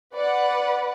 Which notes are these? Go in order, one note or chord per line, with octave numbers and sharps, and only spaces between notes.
B4 D5 F#5